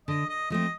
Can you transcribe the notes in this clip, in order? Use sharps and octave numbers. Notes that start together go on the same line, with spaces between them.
D3 D#5
D#5
F3 A3 C4 D#5